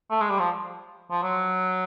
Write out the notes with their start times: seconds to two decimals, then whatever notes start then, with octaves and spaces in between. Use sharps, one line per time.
0.10 A3
0.21 G#3
0.30 G3
0.39 F3
1.11 F3
1.23 F#3